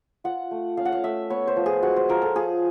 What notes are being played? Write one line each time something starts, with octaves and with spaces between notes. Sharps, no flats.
F4 F#5
A3
C#4 F5
F#5
F5
A3 E5
B3 C#5
C5
F3
G#4
G#3 F#4
C5
F3 A#4
A4
F4 G#4